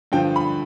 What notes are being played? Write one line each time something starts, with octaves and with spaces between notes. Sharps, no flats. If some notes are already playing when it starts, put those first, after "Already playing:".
G2 D3 F3 G5
B5